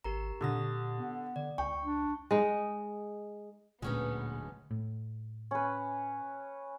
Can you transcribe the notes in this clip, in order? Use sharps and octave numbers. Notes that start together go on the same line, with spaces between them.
G#1 G4 A#4 A#5
A#2 D3 G4 D#6 A#6
B3
D3 D5
C#2 G5 C#6
D4
G#3 D#4
D1 D2 A#2 G#3 B3 C#4 D#4
A2
C#4 B4